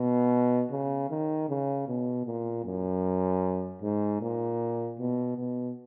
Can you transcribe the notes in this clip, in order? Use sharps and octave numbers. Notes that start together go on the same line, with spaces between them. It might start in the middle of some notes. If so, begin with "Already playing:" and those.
Already playing: B2
C#3
D#3
C#3
B2
A#2
F#2
G#2
A#2
B2
B2